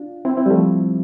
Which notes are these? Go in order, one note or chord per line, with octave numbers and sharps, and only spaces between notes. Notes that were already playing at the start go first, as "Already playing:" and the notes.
Already playing: D4 F4
C4 E4
C4 E4
G3
F3 A3